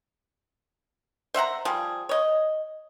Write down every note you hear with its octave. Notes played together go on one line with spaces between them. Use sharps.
C5 E5 F#5 A#5
F3 G3 G#4
C#5 D#5